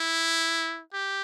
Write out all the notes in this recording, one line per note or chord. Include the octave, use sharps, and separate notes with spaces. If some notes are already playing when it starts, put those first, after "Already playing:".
Already playing: E4
G4